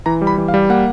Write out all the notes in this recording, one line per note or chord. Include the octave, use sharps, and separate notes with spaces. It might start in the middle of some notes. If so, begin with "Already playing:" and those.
E3 A#5
G3
B5
E3
F5
G3
A#3 F#5